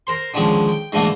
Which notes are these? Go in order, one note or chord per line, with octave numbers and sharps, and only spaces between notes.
A#4 C5 C6
D3 D#3 F3 G#3 C#4
G5
G#2 B2 D3 E3 A3 A#3